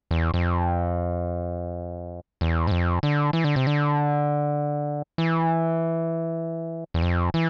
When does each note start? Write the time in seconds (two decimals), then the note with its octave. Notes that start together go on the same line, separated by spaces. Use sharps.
0.11 E2
0.34 F2
2.41 E2
2.67 G#2
2.71 F2
3.03 D3
3.33 E3
3.44 D3
3.56 C3
3.67 D3
5.18 E3
6.94 E2
7.02 F2
7.34 E3